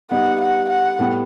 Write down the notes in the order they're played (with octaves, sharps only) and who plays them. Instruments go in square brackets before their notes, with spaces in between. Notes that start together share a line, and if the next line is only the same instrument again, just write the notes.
[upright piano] G3 B3 D#4 G4 [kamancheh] F#5
[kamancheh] F#5
F#5
[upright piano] A2 G3 B3